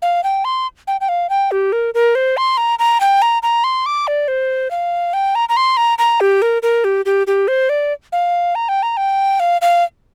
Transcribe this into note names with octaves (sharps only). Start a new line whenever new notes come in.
F5
G5
C6
G5
G5
F5
G5
G4
A#4
A#4
C5
C6
A#5
A#5
G5
A#5
A#5
C6
D6
D5
C5
F5
G5
A#5
A#5
C6
A#5
A#5
G4
A#4
A#4
G4
G4
G4
C5
D5
F5
A#5
G5
A#5
G5
F5
F5